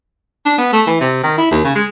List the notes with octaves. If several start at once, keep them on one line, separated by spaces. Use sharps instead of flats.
D4
B3
A3
E3
C3
D#3
E4
D#2
C#3
G#3